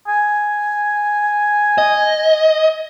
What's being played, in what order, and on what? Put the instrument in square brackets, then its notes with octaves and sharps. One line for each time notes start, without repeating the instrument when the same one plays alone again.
[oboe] G#5
[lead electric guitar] D#5